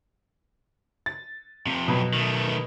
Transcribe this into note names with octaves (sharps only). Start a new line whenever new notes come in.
A6
F2 C3
B2 F#3 B5
D#3 A3